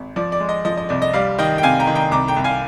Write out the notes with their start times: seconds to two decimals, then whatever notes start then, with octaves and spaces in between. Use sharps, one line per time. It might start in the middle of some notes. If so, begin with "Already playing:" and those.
Already playing: G#1
0.16 F3 D5
0.32 D5
0.40 G#3
0.49 D#5
0.65 F3 D#5
0.77 D#5
0.89 C2 D5
1.02 D#5
1.13 G3 D5 F5
1.38 D#3 D#5 G5
1.58 G5
1.63 C3 F5 G#5
1.80 G5 A#5
1.87 D#3
1.95 G5 A#5
2.11 C2 A#5 D6
2.28 G5 A#5
2.37 C2
2.44 F5 G#5